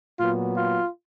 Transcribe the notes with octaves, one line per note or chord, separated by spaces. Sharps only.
A#2 F#3 B3 F4
F4